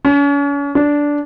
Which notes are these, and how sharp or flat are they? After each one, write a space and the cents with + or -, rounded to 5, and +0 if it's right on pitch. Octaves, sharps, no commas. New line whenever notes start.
C#4 +40
D4 -10